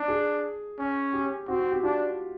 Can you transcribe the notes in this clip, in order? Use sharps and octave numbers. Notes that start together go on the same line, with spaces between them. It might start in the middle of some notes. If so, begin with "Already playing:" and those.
Already playing: D4
G#4
C#4
G4
C4 F#4
F#4
G4
D4 F4